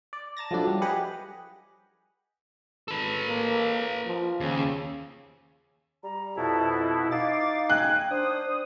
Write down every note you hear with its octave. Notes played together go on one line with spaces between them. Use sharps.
D5
A5 A#5 A6 A#6
F3 F#3 A3 D4 E4
G3
G4 G#4 B4 D#5 F#5
G#1 A4 B4
A#3
F3
D#2 C#3
G3 A#5
F2 B2 E4 A5
D#4 F5 D6 A6
G5 G#5 F#6
D4 C5 D#6